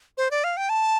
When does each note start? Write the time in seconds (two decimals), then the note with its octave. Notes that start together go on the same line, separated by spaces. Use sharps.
0.17 C5
0.31 D5
0.44 F5
0.57 G5
0.69 A5